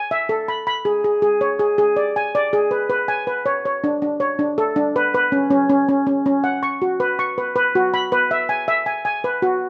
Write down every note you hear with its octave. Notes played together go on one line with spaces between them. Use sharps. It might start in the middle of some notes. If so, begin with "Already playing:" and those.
Already playing: G#5
E5
A4
B5
B5
G#4
G#4
G#4
C#5
G#4
G#4
D5
G#5
D5
G#4
B4
B4
G#5
B4
C#5
C#5
D4
D4
C#5
D4
A4
D4
B4
B4
C#4
C#4
C#4
C#4
C#4
C#4
F#5
C#6
F#4
B4
C#6
B4
B4
F#4
B5
B4
E5
G#5
E5
G#5
G#5
B4
F#4